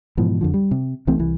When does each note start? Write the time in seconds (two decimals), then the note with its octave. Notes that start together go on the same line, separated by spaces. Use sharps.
0.17 G#2 B2 E3 F3
0.41 F2 D3 F3
0.54 G3
0.71 C3
1.07 C2 E3 A3 C4
1.19 C2 E3